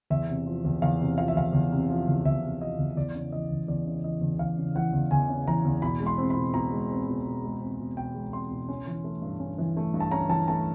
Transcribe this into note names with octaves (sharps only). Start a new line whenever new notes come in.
E2 E5
C3
F3
E2
E2 F5
C3
F3 F5
E5
E2 F5
E2
C3
F3
E2
E2 E5
C3
F3 D#5
E2
E2 D5
C#3
E3 D#5
E2
E2 D5
C#3
E3 D#5
E2
E2 F5
C#3
E3 F#5
E2
E2 G#5
C#3
E3 A#5
E2
B2 B5
G#3
C6
C4
B5
B2
B2 A#5
G#3
C4
B2
B2
G#3
C4
B2
B2 G5
G#3
C4 C6
B2
C#4
E3
A3
G2
C#4
E3
A3
G2
A5
C#4 A#5
E3 A5
A3 A5